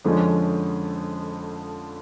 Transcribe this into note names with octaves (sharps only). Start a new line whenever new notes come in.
F2 D3 F3 G#3 C#4